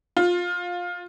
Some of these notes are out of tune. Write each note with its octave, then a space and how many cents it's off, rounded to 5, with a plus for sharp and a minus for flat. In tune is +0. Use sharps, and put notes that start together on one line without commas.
F4 +15